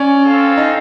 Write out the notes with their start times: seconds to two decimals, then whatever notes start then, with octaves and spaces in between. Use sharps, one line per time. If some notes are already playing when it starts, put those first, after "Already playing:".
Already playing: C#4 D5
0.24 C4 F4 A4
0.57 D#4